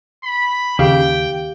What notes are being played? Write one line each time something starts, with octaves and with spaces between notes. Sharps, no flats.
B5
D#2 C#3 G4 F5 G5